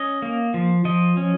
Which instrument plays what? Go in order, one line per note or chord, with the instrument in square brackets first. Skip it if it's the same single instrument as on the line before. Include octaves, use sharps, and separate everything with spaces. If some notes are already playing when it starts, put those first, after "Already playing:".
Already playing: [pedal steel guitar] C#4 D#5
A#3
F3
F3 D#5
C#4